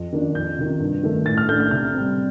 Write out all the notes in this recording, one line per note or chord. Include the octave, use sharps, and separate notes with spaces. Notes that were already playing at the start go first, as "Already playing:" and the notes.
Already playing: F2
D#3 A#3 D4
F2 G6
C3 D#3
G2
D#3 A3
A2 A6
F6
A3 D4 G6
G6
C3 F6
G3 C4